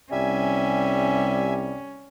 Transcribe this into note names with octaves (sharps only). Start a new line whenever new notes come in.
C2 G3 C#4 E5 G#5